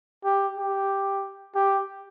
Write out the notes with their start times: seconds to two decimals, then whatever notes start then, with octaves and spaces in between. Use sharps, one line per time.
0.24 G4
0.57 G4
1.55 G4